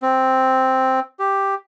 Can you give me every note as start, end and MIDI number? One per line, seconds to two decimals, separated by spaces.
0.02 1.00 60
1.19 1.55 67